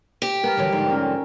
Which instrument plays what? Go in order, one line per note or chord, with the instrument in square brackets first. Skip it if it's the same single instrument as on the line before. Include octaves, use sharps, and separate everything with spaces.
[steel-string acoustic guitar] G4
[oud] B3 [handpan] A#4
[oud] D3 E3 F#3
F2 G#2 D3
[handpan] C#4 A#4